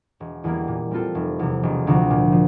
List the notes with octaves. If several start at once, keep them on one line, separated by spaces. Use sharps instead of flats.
E1
E2 E3 G3 A#3
A#2
G3 C4 F4 A4
F1
E2 C3
E1
D2 C3 F3
A#2
F3